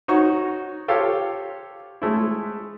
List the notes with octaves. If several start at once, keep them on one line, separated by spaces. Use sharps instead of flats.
D#4 F#4 C#5 C#6
F4 G4 A4 C#5 F5
G#3 A3 E4